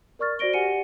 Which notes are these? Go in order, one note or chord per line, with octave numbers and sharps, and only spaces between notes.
A#4 D5 C#6 F6 A6
F#4 C5 D5 A#6 D7 G7
G4 D5 F#5 G#5 C#7 D#7